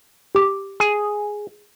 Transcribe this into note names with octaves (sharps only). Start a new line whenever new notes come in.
G4 D6
G#4